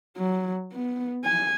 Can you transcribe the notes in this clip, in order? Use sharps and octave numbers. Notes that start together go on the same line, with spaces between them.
F#3
B3
G#5